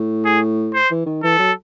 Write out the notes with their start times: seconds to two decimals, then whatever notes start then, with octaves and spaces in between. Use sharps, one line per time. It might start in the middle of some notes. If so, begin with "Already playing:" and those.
Already playing: A2
0.25 G#4
0.74 C5
0.91 E3
1.06 D#3
1.23 E3 A4
1.39 F#3